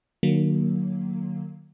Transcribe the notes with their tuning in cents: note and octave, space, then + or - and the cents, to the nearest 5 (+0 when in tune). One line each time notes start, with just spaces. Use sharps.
D#3 -45 F#3 +0 A#3 +0